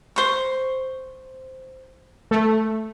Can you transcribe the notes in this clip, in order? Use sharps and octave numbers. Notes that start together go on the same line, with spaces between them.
C5 C#6
A3